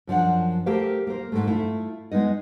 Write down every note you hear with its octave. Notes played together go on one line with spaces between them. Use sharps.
F#2 F3 D4 F#5
A3 G4 A#4 C5 F5
A#3 A#4 C5
G#2 B2 A3
A3 E4 F4
G#3 B3 D#4 D#5